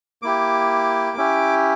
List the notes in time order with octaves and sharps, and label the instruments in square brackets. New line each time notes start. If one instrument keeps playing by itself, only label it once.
[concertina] A#3 E4 G4 D6
C#4 E4 G4